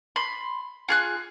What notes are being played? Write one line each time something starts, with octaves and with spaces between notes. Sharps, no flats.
B5 C6
F4 G#4 F#6